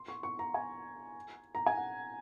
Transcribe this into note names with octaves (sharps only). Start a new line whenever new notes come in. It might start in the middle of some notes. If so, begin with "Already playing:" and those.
Already playing: C6
C#6
C#6
A#5
G#5
A#5
G#5
F#5